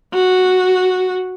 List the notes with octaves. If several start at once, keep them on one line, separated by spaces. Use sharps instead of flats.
F#4